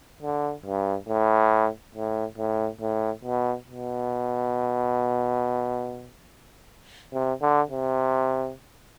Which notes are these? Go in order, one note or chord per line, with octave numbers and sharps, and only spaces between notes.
D3
G2
A2
A2
A2
A2
B2
B2
C3
D3
C3